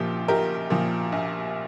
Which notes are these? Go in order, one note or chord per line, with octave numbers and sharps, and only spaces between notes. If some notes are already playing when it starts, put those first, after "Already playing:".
Already playing: A#1 A#2 F3 G4
A#1 G4 A#4
A#2 F3
A#1